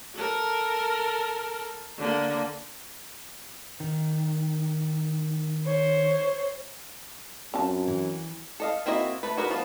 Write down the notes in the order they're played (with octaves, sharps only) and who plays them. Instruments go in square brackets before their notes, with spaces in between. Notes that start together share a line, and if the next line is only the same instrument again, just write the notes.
[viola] A4 A#4
D3 A#3
[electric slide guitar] D#3
[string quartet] C5 C#5
[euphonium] F#2 [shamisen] C4 F4 A5
[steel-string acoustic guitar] E3
[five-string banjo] A4 D#5 F5
A#3 C4 E4 F#4 D#5
A3 B4
F#4 G#4 A#4 B4
F3 B3